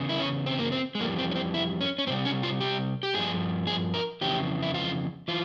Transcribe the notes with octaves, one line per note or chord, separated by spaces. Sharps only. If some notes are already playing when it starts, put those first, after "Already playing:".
Already playing: E2 C#3
E4
C#4
C4
A#3
C4
G#3
F2 E3 G3 A#3
C4
C#4
C4
E4
C#4
C#4
E2 C4
C3 G3
C#4
F4
G4
G4
G2 F3 G#4
G#4
A#4
F2 C#3 E3 G4
E4
F4
E3 F4